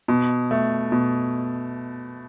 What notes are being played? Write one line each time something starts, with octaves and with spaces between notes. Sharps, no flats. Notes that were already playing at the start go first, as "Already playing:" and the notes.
B2
A3
B2